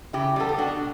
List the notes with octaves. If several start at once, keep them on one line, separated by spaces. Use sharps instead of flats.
C#3 E4 G4
G3 B3 A4
G4
B2 D4 F#4